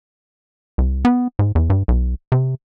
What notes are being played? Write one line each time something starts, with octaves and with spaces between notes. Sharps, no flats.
C2
B3
G#2
E2
G2
B1
C3